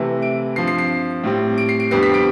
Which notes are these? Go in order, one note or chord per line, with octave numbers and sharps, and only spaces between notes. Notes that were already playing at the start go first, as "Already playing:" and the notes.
Already playing: C3 E3 A3
D7
G2 F3 C4 C7
C7
C7
A2 G3 C4
D7
C7
D7
F2 D3 G3 B3 C7
B6
D7